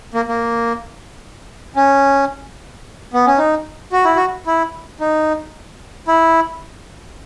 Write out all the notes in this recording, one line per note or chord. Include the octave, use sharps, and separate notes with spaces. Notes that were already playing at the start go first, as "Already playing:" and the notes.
A#3
A#3
C#4
B3
C#4
D#4
F#4
E4
F#4
E4
D#4
E4